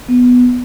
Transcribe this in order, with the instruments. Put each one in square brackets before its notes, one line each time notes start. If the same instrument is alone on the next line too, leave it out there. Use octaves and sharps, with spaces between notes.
[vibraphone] B3